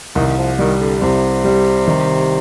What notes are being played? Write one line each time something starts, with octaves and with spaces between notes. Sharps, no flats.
C2 D#3
D#3
F3
D#3 G3
D3
C2 C3
G3
D#3